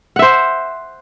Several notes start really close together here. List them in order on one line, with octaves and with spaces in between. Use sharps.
F#5 E5 C5